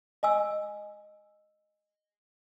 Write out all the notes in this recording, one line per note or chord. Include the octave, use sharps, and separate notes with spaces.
D#5 G#5 E6